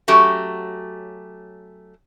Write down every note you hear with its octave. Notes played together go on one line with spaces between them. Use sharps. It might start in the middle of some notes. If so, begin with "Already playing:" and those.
F#3 A3 C#4 F#4 G4